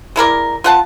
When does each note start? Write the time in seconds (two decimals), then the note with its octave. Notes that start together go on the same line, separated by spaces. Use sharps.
0.16 G#3 E4 A#4 D5
0.64 F4 F#5 A5